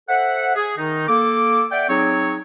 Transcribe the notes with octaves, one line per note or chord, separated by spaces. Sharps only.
A4 C5 E5 F#5
G#4
D#3 D#4
A#3 A4 D6
D5 E5 F#5 G5
F#3 C4 D#4 G#4 C#5